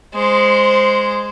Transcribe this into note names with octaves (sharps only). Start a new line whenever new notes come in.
G#3 C5